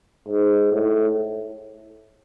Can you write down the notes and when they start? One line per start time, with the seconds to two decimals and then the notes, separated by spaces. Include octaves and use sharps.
0.28 G#2
0.72 A2